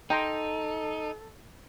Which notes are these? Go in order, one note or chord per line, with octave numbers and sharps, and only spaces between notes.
D#4 A4 G5 A#5 C6